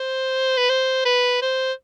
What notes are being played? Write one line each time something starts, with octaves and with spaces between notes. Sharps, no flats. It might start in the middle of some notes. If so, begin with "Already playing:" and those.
Already playing: C5
B4
C5
B4
C5